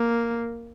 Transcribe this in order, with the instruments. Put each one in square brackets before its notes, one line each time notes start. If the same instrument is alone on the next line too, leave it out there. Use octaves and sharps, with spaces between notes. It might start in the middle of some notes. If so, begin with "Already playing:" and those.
Already playing: [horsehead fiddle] A#3